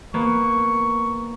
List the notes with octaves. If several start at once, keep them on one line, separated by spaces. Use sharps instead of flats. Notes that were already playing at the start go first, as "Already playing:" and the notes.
A#3 B3 C#6